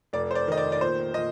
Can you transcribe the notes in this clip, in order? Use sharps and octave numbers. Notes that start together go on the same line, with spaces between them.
F1 D5
C5
D5
D#3 D#5
D5
D5
A#2 C5
A#2 D#5